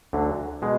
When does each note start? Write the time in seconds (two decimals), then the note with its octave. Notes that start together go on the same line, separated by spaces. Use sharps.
0.13 D2 D3 F#3
0.62 B2 G#3